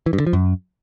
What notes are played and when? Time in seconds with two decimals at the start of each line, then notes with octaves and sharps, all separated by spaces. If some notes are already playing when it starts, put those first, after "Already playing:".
0.06 E3
0.13 G2
0.20 D3
0.27 F3
0.33 F#2